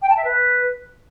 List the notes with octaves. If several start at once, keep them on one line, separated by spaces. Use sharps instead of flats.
G5
A5
E5
B4